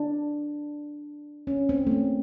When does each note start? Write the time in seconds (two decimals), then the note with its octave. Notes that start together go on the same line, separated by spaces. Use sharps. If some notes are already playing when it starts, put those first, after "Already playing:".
Already playing: D4
1.47 C#4
1.69 C4
1.87 A3
1.91 A#3